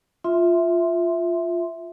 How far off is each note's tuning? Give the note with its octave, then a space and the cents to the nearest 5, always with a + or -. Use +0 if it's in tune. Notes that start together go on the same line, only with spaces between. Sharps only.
F4 +0 E5 +0 C6 +0